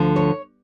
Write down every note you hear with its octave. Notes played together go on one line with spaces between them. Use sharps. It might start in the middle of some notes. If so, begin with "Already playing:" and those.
Already playing: D2 D3 F3
C#5